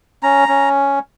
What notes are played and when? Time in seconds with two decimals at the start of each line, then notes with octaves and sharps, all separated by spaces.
0.23 C#4 A#5
0.48 C#4